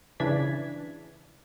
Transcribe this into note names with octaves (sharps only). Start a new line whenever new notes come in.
C#3 E3 D4 G#6 B6